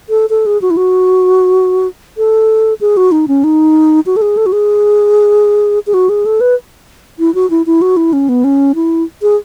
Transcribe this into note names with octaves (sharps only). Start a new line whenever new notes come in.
A4
A4
G#4
F#4
E4
F#4
A4
G#4
F#4
D#4
C#4
D#4
F#4
A4
G#4
A4
F#4
G#4
G#4
F#4
G#4
A4
B4
E4
F#4
E4
E4
F#4
E4
C#4
B3
C#4
E4
G#4